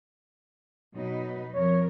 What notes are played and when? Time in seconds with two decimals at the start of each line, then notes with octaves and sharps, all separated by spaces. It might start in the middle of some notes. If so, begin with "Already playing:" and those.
0.95 B2 F#3 D#4 B4
1.54 F2 A#4 C#5